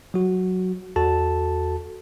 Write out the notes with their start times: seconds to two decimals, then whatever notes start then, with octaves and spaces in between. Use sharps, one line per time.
0.14 F#3 F#4
0.96 E2 F#4 A4 A5